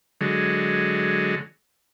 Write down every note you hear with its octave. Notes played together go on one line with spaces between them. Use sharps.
D3 F#3 G#3